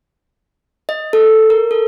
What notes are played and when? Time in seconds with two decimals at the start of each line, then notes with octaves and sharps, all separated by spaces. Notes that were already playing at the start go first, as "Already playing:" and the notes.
0.89 D#5
1.13 A4
1.50 A#4
1.71 A4